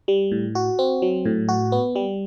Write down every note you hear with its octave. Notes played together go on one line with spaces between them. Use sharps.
G3
A2
F#4
C4
F#3
A2
F#4
B3
G3